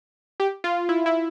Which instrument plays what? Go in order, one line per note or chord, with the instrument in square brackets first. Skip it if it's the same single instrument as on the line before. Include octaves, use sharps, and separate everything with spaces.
[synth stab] G4
F4
E4
E4